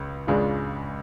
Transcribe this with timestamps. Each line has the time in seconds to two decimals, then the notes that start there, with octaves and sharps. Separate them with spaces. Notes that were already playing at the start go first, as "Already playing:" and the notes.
Already playing: C#2 C#3
0.27 C#2 C#3 G#3 D4 F4